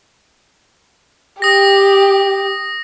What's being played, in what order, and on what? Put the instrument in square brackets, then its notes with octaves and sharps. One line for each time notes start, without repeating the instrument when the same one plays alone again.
[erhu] G4 [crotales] D#6 A#6